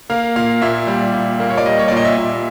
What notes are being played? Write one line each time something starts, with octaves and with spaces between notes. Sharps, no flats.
A#3 F5
A#2 F5
A#2 E5
G3
A#2
A#3
C#5
D5
G3 D#5
C#5
A#2 D5
D#5
E5
A#2